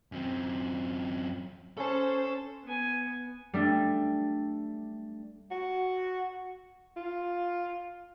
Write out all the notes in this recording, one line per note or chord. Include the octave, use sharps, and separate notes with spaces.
F#2 C4
C#4 A4 C5 A5
B3 G#5
G3 A3 D4
F#4
F4